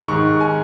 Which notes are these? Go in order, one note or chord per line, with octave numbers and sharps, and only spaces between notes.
G#2 D#3 C#6
G#5